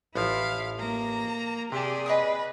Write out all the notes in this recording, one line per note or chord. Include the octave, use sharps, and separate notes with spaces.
A1 F3 E4 F5
A#3 A#5
C3 G4 G#4 D5 A5
B4 D#5 G#5 D#6